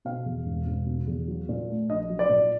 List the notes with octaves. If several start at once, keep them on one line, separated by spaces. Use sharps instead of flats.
B2 F5
E2
E1
E1
B2
E2
F#3
A#2
A3
A#1 D#5
F#3
D5
A#2